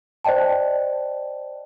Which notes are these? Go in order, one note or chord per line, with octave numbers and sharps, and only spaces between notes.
C5 D5 D#5 G5 A5